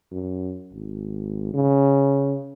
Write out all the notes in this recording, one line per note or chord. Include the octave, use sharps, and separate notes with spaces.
F#2
G#1
C#3